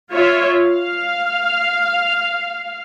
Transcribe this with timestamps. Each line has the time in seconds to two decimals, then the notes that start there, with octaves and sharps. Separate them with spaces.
0.12 F4 C#5 E5
0.64 F5